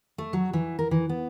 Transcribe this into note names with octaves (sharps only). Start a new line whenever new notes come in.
A3
F#3
E3
A#4
E3
B3